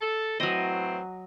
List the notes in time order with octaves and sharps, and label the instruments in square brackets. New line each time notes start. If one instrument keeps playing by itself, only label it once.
[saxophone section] A4
[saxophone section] A2 E3 C4 [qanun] F#3 D#5